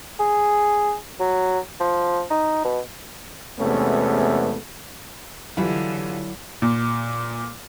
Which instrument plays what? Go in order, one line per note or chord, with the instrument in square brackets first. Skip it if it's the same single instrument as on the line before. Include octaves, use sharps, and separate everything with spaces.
[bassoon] G#4
F#3
F3
D#4
B2
[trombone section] E2 C3 G#3 A3 B3 C#4
[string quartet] D3 [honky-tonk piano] E3 G3 F4 [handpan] F#3 [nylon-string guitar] E4
[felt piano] A#2